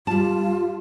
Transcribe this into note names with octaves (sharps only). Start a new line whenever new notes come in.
G3 F4 A5